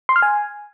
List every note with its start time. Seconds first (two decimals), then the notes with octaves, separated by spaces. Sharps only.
0.09 C6
0.16 F6
0.22 G#5